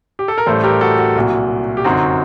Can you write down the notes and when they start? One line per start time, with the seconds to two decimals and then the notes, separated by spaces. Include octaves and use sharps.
0.19 G4
0.28 A4
0.38 A#4
0.46 A1 A2 G3 A4 C5
0.63 G4 A#4
0.81 F#4 A4
0.98 F#4
1.16 C2 A#2 F#3
1.77 G4
1.84 G1 F#2 F#3 C4 D#4 F#4